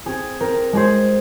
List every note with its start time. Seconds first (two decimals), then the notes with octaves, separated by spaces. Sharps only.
0.06 C4 G#4
0.40 C4 A#4
0.73 G#3 G#4 C5